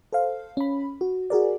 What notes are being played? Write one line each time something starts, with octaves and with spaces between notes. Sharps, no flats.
A4 C5 F5
C#4 B5
F#4
F#4 G#4 A#4 D5